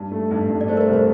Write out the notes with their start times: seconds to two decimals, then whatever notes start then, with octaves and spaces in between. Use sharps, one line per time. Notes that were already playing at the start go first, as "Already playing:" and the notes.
Already playing: G2
0.12 A3
0.31 G2
0.49 G2
0.61 D5
0.68 A3 C5
0.77 A#4
0.81 C5
0.88 C2
0.93 C5